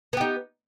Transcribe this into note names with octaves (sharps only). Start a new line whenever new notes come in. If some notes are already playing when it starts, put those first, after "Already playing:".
B3 D#4 G4